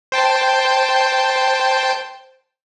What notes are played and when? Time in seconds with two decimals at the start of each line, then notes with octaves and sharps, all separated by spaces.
0.12 C5 G5 A5